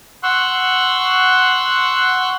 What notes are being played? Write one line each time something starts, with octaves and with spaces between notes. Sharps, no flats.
F#5 C6 C#6 E6 F#6